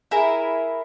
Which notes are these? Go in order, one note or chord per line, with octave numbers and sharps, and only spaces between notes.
E4 G#4 A#4